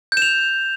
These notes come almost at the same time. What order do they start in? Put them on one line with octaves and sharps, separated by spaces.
G6 E7 F7